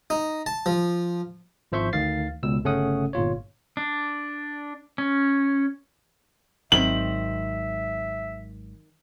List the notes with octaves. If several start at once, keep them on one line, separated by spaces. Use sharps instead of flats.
D#4
A5
F3
G#1 F3 C5 E5 C#6 G6
D2 D#3 F5 A6 C7
C#2 B2 E6
G1 C#3 A3 C#4 F#5 D#6
G1 A#2 F4 C#5
D4
C#4
G#1 C#2 D#3 F#3 C4 E5 F#7